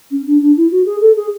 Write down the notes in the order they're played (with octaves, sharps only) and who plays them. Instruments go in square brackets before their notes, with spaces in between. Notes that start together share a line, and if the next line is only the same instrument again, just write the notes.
[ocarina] C#4
D4
D4
E4
F#4
G#4
A4
G#4